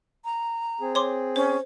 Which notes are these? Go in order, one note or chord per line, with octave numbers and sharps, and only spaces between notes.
A#5
C4 G#4
C#5 C6 D6
C#4 C5